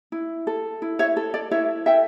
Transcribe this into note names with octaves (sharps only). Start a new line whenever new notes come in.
E4
A4
E4
C#5 E5
A4
D5
E4 C#5 E5
A4 E5 G5